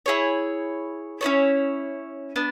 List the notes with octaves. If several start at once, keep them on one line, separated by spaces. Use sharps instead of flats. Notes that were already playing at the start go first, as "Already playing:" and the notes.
E4 G#4 C#5
C#4 E4 A4 C#5
B3 D4